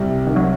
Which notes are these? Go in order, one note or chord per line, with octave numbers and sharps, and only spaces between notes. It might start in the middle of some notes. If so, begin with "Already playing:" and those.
Already playing: C2 C3 G3
D#3
F#3